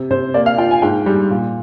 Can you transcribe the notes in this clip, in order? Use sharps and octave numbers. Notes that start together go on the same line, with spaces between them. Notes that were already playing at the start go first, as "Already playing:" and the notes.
Already playing: C3
C3 C5
A#3 D5
F5
F4 G5
G#5
G#2 G5
G3
A#2